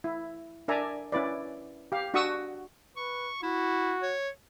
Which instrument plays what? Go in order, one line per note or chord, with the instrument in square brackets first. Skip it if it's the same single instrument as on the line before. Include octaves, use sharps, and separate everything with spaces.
[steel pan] E4
D4 A#4 D5 E5 G#5 A#5
C#4 E4 B4 D5
G4 F5
D4 F#4 F#5 C#6 D#6 E6
[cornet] B4 [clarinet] C#6
[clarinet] E4 [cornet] F#4
[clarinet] C#5